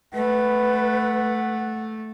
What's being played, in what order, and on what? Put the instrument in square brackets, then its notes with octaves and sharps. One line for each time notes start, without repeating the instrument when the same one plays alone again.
[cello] A3 [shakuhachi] B4 [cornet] F#5